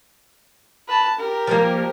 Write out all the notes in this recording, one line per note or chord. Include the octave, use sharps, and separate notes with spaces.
B4 A5
G4 A#4
F3 G3 A#3